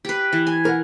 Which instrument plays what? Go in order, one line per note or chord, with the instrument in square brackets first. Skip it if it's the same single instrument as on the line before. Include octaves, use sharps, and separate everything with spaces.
[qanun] G4 B4
E3
G#5
[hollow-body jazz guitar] A#4 F#5